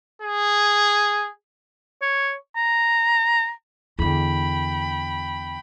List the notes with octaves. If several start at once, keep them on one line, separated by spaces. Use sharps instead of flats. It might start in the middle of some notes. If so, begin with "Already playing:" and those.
G#4
C#5
A#5
E2 D3 G5 B5